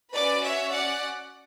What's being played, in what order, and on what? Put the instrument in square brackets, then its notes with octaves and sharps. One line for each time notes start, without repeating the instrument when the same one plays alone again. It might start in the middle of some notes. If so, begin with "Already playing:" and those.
[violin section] C#4 F#4 B4 D5
C#5 E5
D5 F#5